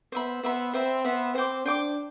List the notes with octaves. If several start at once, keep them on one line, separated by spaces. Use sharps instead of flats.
B3 C5 E5 B5
B3 C5 E5 B5
C4 C5 E5 B5
B3 C5 E5 B5
C4 C5 G5 D6
D4 C5 G5 D6